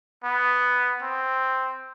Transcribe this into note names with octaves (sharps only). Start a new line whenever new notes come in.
B3
C4